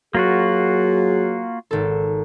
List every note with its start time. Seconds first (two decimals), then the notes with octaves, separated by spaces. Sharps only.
0.15 F#3 A#3 F4 F#4 G#4
1.71 G#1 A4